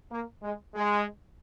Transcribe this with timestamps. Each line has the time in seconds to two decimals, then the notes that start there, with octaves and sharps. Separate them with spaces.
0.11 A#3
0.43 G#3
0.75 G#3